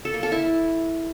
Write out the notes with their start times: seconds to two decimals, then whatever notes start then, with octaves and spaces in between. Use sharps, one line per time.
0.05 A4
0.14 A#3
0.23 A4
0.32 E4